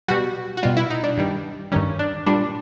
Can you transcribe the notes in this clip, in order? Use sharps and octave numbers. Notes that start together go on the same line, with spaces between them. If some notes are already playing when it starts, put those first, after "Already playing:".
B2 G3 F#4
F#4
B2 G3 F4
E4
D#4
D4
G2 D#3 G3
G2 D#3 G3 C#4
D4
A#2 G3 D4